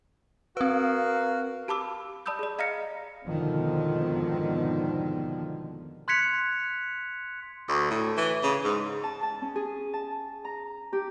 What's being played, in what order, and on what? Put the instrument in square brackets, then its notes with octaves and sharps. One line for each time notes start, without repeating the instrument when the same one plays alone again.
[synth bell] C4 B4 [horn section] F#4 A#4 F5
[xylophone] G4 A5 B5 D6 E6
D5 A5 B5 D#6 E6 G6
G#4 D5
D#5 F5 A#5 F6 A#6 C#7
[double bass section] F2 G#2 B2 D3 D#3 F3
[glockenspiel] C6 F#6 G#6 B6 C#7 F7
[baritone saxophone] D2
A2
E3
C#3
G#2
[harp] A5
A5
C#4
G#4
A5
A#5
G4